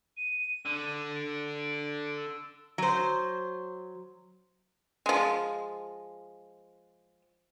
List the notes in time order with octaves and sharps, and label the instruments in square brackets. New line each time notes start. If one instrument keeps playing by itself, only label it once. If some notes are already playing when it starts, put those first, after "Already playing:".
[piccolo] D#7
[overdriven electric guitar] D3
[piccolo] D7
E6
[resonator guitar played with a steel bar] F#3 C5
[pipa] F3 G#3